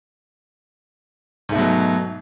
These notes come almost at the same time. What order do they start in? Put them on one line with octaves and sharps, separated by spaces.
G#2 A3 B2 F#3